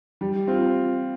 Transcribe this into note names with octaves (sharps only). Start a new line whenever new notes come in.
G3
C4 F4